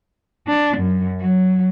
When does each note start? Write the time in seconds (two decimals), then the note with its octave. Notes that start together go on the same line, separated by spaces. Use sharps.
0.48 D4
0.77 F#2
1.21 F#3